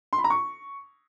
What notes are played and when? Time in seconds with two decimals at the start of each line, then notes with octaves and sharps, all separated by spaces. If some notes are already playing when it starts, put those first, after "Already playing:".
0.13 C6
0.18 B5
0.24 A#5
0.30 C#6